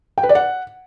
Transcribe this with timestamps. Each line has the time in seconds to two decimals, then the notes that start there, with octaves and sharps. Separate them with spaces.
0.18 G5
0.23 B4
0.29 D5
0.35 F#5